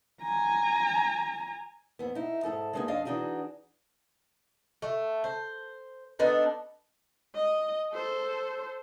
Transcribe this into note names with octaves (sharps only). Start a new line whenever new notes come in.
G#5 A#5
F2 B3
D#4 E4
G#2 G#3 A4 A5
G#3 A#3 B3 D#4 F#4 G#4
F2 D4 D#5 F5
E3 D4 D#4 F#4 G#4
A3
C5
B3 D4 D#4 A4
D#5
A4 C5